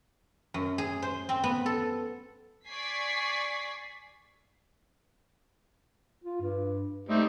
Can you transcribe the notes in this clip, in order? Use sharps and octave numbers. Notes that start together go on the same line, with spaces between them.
F#2
G#4
C5
C4
B3
A4
D5 G#5 C#6 G#6 B6 C7
F4
G2
G3 A3 C4 D#4